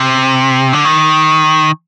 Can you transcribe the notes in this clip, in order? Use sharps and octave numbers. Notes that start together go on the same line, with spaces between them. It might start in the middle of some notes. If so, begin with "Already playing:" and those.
Already playing: C3
D3
D#3